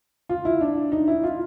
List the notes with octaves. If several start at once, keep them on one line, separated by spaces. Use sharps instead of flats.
F4
E4
D4
D#4
E4
F4